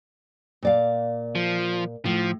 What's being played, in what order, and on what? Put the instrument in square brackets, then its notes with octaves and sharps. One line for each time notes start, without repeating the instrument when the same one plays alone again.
[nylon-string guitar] A#2 D5 F5
[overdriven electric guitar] F3
[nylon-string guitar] A2 [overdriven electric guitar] F3